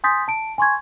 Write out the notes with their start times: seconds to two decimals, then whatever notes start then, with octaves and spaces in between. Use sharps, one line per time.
0.04 G#5 C6 D#6 G6 A6 B6
0.28 A5 D7
0.58 G#5 C6 C#6 G#6